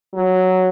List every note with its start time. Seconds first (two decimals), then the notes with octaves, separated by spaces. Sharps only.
0.15 F#3